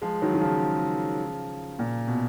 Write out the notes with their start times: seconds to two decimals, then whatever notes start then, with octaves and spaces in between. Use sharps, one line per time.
0.02 F3 G#3
0.22 D#3 F#3
0.34 D#3
0.41 C#3 F3
1.79 A#2
2.07 B2